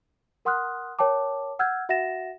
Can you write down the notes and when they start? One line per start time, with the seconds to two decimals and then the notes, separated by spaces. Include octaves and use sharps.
0.45 A#4 F#5 C6 D#6 F6 F#6
0.99 A#4 C#5 G5 A5 D6
1.59 F#5 E6 F6 G6 G#6
1.89 F#4 E5 F#5 A6 A#6 E7